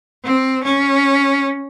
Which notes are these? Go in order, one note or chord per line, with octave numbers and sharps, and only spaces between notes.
C4
C#4